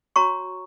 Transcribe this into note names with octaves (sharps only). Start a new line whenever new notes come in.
F#4 C#5 A#5 C#6